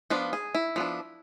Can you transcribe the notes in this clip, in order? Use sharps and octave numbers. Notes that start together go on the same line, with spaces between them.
F3 B3 D4 F4
G#4
E4
F3 B3 D4